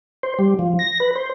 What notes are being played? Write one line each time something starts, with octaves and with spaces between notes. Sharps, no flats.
C5
G3
F3
A#6
B4
C5